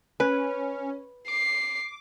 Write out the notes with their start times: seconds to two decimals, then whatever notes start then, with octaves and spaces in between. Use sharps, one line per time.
0.20 C#4 B4
1.28 D6 C7